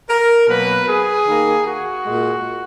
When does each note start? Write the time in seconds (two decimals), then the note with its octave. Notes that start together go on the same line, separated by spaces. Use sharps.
0.09 A#4
0.48 B2 F#3 A#3 B4
0.87 G#4
1.26 D#3 A#3
1.66 F#4
2.05 A#2 G#3